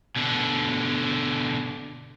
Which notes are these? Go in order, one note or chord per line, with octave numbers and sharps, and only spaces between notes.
B2 D3